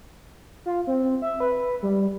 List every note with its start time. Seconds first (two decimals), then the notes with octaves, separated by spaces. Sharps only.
0.66 F4
0.87 C4
1.22 E5
1.40 B4
1.83 G3